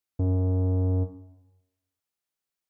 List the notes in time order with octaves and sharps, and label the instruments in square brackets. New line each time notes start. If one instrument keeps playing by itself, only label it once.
[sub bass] F#2